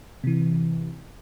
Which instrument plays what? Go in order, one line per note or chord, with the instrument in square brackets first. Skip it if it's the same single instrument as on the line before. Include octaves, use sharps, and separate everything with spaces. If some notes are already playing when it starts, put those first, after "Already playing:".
[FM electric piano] C3 E3